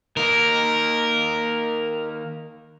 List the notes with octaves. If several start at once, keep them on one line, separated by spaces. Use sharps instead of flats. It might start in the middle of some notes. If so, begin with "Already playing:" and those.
D#3 A#3 A#4